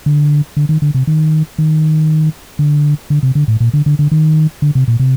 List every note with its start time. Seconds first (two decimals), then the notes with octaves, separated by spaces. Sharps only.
0.06 D3
0.57 D3
0.69 D#3
0.82 D3
0.94 C3
1.07 D#3
1.58 D#3
2.59 D3
3.10 D3
3.23 C3
3.35 D3
3.48 A2
3.60 A#2
3.74 D3
3.86 D3
3.99 D3
4.12 D#3
4.62 D3
4.75 C3
4.88 A#2
5.00 C3